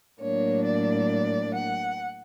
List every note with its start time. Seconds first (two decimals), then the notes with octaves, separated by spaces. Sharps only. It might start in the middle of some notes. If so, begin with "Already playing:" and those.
0.20 A2 F#3 A#3 D4 C#5
0.65 D5
1.55 F#5